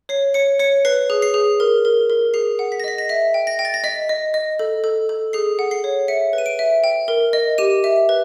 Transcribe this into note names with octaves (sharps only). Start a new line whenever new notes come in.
C#5 C7
C#5 C#7
C#5 C#7
B4 C7
G#4
C7
G#4
A#4
A#4
A#4
G#4 C7
F#5
B6
A#6
D#5 B6
A#6
E5 B6
G5
A#6
G5
A6
A#6
D#5 B6
D#5
D#5
A4
A4
A4
G#4 C7
F#5
C7
C#5
E5 C#7
B4
D#7
D7
E5
G5
A#4
D#5
G4 D#7
E5
B4